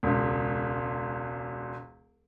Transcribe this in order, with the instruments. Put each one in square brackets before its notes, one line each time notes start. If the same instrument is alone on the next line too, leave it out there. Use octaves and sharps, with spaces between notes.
[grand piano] E1 C#2